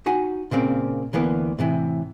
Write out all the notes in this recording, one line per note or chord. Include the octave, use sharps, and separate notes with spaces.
D#4 F#4 F#5 G#5
A#2 C#3 A#3 C4
D2 E3 A#3 B3
A2 C3 E3